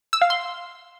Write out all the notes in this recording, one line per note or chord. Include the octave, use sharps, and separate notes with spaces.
E6
F5
C6